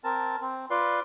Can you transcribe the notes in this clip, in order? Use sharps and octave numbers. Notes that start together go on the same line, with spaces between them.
C4 A#4 A5
C4
F4 B4 D5 C6